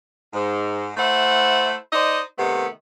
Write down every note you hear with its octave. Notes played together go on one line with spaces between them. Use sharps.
G#2
A3 E4 C5 F#5
D#4 C5 D5 D#5
C3 D#3 A3 B3